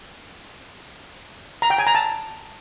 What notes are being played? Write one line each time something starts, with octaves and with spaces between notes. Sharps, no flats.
A#5
G5
G#5
A#5
A5